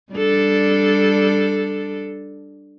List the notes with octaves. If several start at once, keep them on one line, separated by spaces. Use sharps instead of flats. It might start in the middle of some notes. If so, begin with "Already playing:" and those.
G3 D4 A4